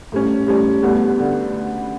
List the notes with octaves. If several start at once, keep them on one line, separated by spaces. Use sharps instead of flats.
A2 G3 C#4
A2 G3 C#4
D2 D3 G3 B3
D3